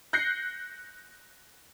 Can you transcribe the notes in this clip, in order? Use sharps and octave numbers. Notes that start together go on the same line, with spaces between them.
F#6 G6 A#6 C7 C#7